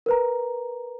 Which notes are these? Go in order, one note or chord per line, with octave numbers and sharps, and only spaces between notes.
A#4 B4 A#5